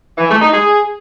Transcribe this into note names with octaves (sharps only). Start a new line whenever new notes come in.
E3
A3
D#4
G#4